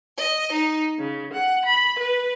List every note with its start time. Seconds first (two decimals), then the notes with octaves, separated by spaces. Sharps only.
0.17 D#5
0.51 D#4
0.98 C#3
1.32 F#5
1.64 B5
1.98 B4